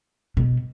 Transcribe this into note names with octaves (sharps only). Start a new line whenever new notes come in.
B2